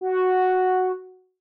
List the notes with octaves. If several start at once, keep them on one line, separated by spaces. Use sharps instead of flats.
F#4